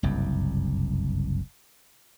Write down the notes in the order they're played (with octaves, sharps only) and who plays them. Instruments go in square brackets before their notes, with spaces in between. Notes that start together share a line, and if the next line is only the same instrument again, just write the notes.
[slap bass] F#1 C2 G2